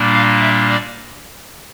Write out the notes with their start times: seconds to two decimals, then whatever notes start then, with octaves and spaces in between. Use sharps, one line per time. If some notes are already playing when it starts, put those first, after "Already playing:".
Already playing: A#2 G3 A#3 D4
0.14 F5
0.41 E5
0.70 D5